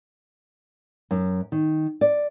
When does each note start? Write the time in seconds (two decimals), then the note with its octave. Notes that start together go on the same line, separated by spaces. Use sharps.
1.11 F#2
1.52 D#3
2.01 D5